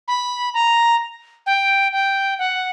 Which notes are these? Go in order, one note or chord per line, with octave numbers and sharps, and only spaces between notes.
B5
A#5
G5
G5
F#5